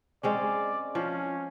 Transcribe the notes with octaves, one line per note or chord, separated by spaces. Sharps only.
G#3 C4 C#4 D5
F3 C#4